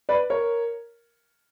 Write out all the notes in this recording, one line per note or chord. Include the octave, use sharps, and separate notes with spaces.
B4 D5
A#4 C#5